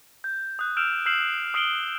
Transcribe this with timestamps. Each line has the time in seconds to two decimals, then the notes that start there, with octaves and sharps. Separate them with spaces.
0.24 G6
0.59 D#6 F#6
0.77 E6 F6 G6 D7 E7 F7
1.06 E6 F6 G6 C7 E7 F#7
1.54 D#6 F6 C7 D7 F#7 G7